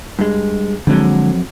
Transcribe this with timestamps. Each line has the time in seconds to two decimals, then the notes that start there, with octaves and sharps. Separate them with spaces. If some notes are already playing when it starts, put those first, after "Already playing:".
0.19 G2 G#3
0.87 F2 D3 F#3 G#3